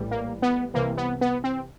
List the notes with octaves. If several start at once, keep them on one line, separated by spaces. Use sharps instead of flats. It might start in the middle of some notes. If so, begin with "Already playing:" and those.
Already playing: A#1 A2 E3 G3
A#3
B3
C2 C3 E3 A#3
B3
B3
C4